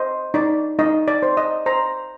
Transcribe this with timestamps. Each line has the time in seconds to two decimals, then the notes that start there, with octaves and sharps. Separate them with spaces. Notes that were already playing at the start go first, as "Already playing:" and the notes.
Already playing: C5 D#5
0.34 D#4 D5
0.79 D#4 D#5
1.08 D5
1.23 C5
1.37 D#5
1.66 C5 A#5